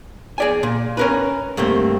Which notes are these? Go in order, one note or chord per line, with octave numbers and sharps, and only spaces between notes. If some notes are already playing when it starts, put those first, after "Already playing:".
G#4 D5 G#5
A#2
C#4 A#4 B4
G2 A3 A#3 C4